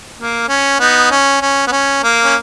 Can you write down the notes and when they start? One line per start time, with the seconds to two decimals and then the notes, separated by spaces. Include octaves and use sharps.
0.19 A#3
0.49 C#4
0.80 B3 D#4
1.11 C#4
1.42 C#4
1.67 B3
1.72 C#4
2.04 A#3
2.24 C#4